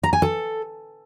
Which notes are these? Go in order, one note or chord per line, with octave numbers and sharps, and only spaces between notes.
A#5
G#5
A4